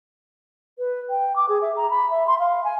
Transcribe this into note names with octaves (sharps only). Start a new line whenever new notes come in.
B4
G5
D6
G#4
E5
A#5
B5
E5
C6
F5
G#5